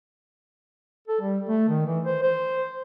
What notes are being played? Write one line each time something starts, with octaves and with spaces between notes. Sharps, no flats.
A4
G3
A3
D#3
E3
C5
C5